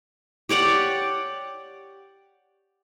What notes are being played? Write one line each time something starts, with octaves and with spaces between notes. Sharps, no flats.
G4 C#5 D5 F#5